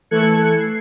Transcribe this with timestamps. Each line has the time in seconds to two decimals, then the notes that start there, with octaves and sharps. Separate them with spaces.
0.11 E3 A3 A4 F#6 G#6 C#7
0.60 C7